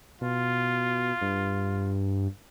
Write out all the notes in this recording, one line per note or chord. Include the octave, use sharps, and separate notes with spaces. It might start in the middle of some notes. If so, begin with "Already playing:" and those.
B2 F4
G2